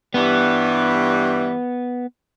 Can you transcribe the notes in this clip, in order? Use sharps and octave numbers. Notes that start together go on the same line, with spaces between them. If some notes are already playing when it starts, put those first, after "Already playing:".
G2 E3 G3 B3